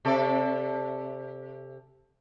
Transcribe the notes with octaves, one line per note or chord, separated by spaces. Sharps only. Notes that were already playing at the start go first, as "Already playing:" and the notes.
C3 A4 D5